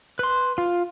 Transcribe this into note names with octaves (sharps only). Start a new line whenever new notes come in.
B4 C6
F4